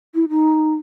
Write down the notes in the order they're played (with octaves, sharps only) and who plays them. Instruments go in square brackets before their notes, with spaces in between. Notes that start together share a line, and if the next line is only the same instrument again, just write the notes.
[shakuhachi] E4
D#4